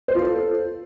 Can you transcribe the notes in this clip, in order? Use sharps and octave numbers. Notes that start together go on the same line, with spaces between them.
C5
F4
A4